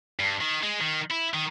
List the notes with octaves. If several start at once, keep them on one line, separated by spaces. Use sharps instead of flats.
G2
D#3
G#3
D#3
E4
D#3